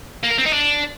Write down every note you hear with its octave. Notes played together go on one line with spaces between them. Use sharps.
A#3
A#4
C4
D#4
D4